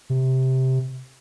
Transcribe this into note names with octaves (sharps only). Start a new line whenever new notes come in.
C3